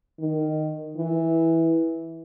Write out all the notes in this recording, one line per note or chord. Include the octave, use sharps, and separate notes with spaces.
D#3
E3